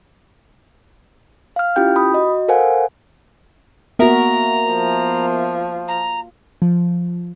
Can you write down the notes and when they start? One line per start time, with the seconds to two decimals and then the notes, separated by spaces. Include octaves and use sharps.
1.56 F5 F6
1.76 C#4 E4 F4 G4 G5 G6
1.96 B5 D#6
2.14 F#4 D#5
2.48 A4 A#4 C5 F5 F#5 G#5
3.99 A#3 B3 F#4 A#4 E5 A#5
4.71 F3
5.87 A#5
6.62 F3